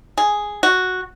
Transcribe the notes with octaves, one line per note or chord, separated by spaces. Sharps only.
G#4
F#4